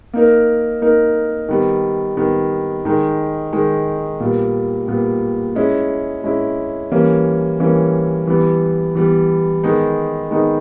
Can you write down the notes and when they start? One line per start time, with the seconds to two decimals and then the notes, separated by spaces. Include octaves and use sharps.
0.14 A#3 D#4 A#4
0.82 A#3 D#4 A#4
1.49 D#3 G3 B3
2.17 D#3 G3 B3
2.85 D#3 G#3 D#4
3.53 D#3 G#3 D#4
4.20 A#2 G3 B3
4.88 A#2 G3 B3
5.55 G#3 C#4 E4
6.24 G#3 C#4 E4
6.92 E3 G3 A#3 C#4
7.60 E3 G3 A#3 C#4
8.27 E3 G3 B3
8.95 E3 G3 B3
9.64 D#3 G#3 B3 D#4
10.31 D#3 G#3 B3 D#4